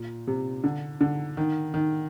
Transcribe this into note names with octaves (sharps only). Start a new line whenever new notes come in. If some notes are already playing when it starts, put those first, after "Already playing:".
Already playing: A#2
C3
D3
D3
D#3
D#3